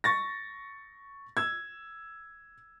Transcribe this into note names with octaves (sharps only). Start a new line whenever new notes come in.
C#6 A6 A#6
E6 G#6